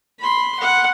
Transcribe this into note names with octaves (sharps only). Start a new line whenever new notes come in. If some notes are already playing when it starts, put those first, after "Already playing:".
B5 C6
F#5